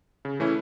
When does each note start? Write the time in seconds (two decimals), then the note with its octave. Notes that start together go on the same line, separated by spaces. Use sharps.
0.25 C#3
0.40 E3 A3 C#4 E4